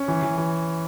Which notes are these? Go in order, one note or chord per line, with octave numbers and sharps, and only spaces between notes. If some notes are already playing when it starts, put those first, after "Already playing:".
Already playing: C#4
E3
E3
E3